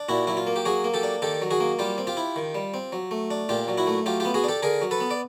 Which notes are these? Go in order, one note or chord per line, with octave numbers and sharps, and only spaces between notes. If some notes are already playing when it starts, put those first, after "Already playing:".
Already playing: D4
A#2 E4 F#4
F#3 E4
F4
A#3
G4
F#3 F#4 G#4
A#3
G4 A4
D4
D#3 G4 A4
F#3
F#4 G#4
A#3
G3 F4 G4
C4
F4 G4
E4
D#3
G3
C4
F#3
A3
D4
A#2 F4 G4
F#3
E4 F#4
A3
F#3 F4 G4
B3 F4 G4
F#4 G#4
D4 G4 A4
D3 G#4 A#4
F#3
A4 B4
B3
D5